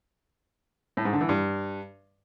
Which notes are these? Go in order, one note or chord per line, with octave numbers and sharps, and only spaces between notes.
A2
G#2
D3
E3
G2